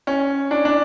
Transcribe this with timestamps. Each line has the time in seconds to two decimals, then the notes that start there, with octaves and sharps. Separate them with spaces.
0.07 C#4
0.51 D4
0.65 D4